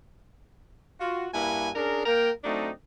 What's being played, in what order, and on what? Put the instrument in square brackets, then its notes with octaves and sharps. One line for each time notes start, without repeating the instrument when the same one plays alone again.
[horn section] F4 F#4
G2 A#3 D4 E4 F#4 G#5
C#4 D4 G#4 A#4
A#3 A#4 G5
F#3 A3 C4 D4 D#4